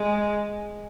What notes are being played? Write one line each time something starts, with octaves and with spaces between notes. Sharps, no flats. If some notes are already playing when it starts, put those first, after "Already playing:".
Already playing: G#3